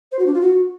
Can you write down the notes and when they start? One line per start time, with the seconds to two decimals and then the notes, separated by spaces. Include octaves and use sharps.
0.11 C5
0.19 F#4
0.26 D4
0.33 F4
0.41 F#4